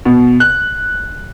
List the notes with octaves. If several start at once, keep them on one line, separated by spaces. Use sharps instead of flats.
B2
F#6